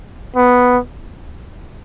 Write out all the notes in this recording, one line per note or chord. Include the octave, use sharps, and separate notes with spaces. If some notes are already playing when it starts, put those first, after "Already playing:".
B3